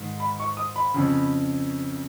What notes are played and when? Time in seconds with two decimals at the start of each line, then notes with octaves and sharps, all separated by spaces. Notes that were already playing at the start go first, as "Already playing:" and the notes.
Already playing: G#2 D#3
0.20 B5
0.40 C#6
0.57 D#6
0.76 B5
0.94 F2 C#3